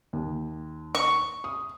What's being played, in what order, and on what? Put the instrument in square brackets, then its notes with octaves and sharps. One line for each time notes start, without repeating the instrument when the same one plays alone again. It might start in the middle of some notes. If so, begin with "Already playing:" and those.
[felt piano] D#2
[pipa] C#6
[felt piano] D#6